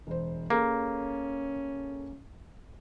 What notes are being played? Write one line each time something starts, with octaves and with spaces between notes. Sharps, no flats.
E1 C5
A#3 C#4 G#4 A4